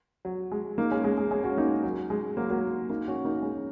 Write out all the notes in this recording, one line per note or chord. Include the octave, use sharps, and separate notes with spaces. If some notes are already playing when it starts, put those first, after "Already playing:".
F#3
G#3
A#3 D#4
G#3 C#4
G#3
G#3
G#3 C#4
C#4 F#4
A#3 D#4
F#3
G#3
F#3 A#3
F#3 A#3
A#3 D#4
C#4 F#4
A#3 D#4
G#3 C#4